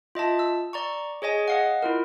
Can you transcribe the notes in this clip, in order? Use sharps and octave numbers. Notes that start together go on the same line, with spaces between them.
F4 D#5 E5 A5
E6
D5 A#5 C#6
G#4 C#5 D#5 G#5
D#5 F5 F#5
E4 F4 A#4